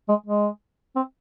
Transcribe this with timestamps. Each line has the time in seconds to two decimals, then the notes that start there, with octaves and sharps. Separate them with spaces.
0.09 G#3
0.26 G#3
0.96 C4